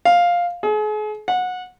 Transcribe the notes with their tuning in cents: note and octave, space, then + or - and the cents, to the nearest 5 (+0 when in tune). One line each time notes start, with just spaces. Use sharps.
F5 +5
G#4 +40
F#5 -20